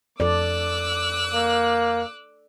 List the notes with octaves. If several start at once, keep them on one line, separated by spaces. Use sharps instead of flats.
F2 A4 D5 D6 E6 F#6
A#3